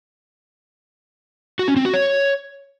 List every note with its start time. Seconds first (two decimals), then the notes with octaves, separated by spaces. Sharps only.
1.59 F#4
1.68 C#4
1.76 C4
1.85 F#4
1.94 C#5